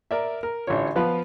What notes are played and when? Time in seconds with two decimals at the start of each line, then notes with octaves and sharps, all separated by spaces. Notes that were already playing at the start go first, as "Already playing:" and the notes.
0.11 A#4 D5 E5
0.43 A#4
0.67 A1 D3 D4 F4 C#5
0.96 F3 B3 B4 F5